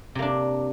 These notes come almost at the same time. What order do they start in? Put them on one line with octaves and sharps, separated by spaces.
C3 A#3 D4